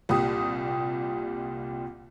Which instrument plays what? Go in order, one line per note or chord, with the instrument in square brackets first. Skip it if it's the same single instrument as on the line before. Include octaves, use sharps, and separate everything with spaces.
[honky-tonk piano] C2 A#2 G4 D#6